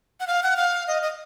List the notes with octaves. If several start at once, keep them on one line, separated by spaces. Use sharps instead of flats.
F#5
F5
F#5
F5
D#5
D#5